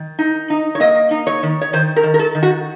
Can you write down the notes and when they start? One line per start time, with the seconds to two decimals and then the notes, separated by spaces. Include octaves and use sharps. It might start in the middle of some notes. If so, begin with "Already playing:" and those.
Already playing: D#3
0.19 D#4
0.50 D#4
0.75 C#5
0.80 A#3 D#5
1.11 D#4
1.27 C#5
1.43 D#3
1.61 C#5
1.73 D#3 C5
1.96 A#4
2.03 D#3
2.14 A#4
2.19 A4
2.35 D#3
2.43 F#4